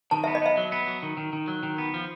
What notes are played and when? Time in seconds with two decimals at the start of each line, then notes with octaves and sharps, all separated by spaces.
0.11 D#3 A5
0.24 B3 E5
0.35 D#5
0.42 B3 E5
0.57 F#3
0.72 B3
0.87 F#3
1.03 D#3
1.17 D#3
1.33 D#3
1.48 F#3
1.63 D#3
1.78 B3
1.94 F3